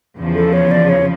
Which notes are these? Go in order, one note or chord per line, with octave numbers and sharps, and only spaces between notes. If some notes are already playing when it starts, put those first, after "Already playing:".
E2 C#3 F3
A4
C#5
D5
C#5